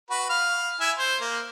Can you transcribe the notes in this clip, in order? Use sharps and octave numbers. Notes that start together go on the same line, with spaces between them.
F#4 B4
F5
E4 E5 G#5
C5
A#3